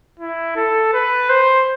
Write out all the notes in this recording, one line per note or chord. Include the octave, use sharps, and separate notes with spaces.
E4
A4
B4
C5